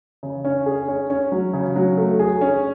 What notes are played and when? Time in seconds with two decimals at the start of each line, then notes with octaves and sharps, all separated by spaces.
0.23 C#3
0.45 C#4
0.66 G#4
0.88 C#4
1.10 C#4
1.32 F#3
1.54 C#3
1.76 F#3
1.98 A3
2.19 G#4
2.41 C#4